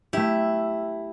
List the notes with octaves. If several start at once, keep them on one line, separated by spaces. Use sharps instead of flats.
A3 E4 G4